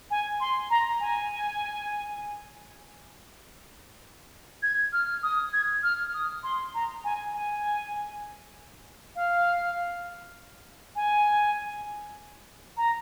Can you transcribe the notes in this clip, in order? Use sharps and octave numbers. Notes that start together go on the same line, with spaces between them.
G#5
C6
A#5
G#5
G#6
F6
D#6
G#6
F6
D#6
C6
A#5
G#5
G#5
F5
G#5
A#5